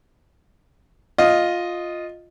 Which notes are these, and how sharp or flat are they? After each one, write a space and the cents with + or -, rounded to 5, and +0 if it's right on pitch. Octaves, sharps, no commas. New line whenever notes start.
F4 +5 D#5 +0